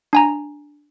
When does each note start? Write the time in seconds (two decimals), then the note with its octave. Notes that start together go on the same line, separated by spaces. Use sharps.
0.13 D4 G#5 A#5